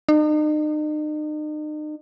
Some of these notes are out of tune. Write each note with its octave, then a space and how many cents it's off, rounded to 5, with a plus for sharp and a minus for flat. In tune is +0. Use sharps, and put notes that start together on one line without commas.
D#4 -40